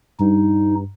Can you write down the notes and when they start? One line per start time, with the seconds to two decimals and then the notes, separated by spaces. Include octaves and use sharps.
0.19 G2 D#4